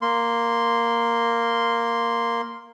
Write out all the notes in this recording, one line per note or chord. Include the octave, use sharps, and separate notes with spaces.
A#3 C6